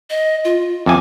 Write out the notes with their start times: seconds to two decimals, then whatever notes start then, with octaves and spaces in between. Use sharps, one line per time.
0.10 D#5
0.45 F4
0.86 F2 E5 G#5 D6